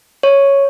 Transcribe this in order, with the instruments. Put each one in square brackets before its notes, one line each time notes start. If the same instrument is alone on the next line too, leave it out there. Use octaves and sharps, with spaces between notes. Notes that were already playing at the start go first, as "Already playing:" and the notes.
[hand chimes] C#5